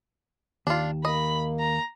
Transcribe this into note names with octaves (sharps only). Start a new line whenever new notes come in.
D#2 D4 F4
A#3 D#5 B5
A#5